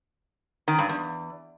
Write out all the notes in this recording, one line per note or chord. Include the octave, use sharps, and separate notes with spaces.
D#3
G2
E2